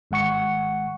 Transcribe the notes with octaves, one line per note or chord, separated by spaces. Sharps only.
G#1 G#3 F#5 C#6 C#7